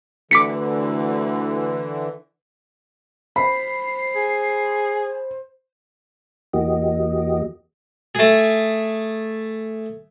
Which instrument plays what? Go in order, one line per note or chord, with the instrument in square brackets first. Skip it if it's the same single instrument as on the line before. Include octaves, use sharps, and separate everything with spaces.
[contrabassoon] D2 [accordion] D3 E3 [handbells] D6 B6 C#7
[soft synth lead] C5 [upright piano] B5 [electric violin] C7
[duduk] G#4
[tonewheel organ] E2 E3 A#3 F#4 G4 D#5
[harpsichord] A3 G#4